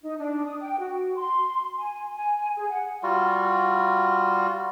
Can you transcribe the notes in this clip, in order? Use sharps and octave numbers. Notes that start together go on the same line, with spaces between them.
D#4
D4
D#6
G5
F#4
C6
G#5
G#5
G#4
F#5
G3 F4 F#4